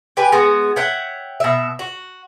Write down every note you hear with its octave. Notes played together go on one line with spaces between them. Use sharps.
G4 B4 G#5
G#3 B3 F#4
C#5 E5 F#5 G5
B2 E5
F#4